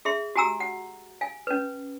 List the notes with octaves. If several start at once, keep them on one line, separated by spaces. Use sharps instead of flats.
G#4 E5 C6
F#4 G4 G#5 A#5 E6
F#5
F5 G#5
C#4 B4